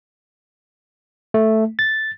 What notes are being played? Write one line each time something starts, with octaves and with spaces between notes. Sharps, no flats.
A3
A6